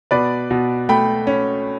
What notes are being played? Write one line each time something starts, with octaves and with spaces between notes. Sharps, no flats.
B2 B4 D5
B2
A3 G5 B5
C#4